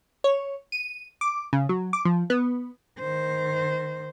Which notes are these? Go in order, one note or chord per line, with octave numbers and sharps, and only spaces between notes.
C#5
D#7
D6
C#3
F#3
D6
F3
B3
D#3 C5